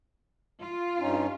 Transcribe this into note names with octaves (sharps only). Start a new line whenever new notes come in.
F4
G2 C#4 D#4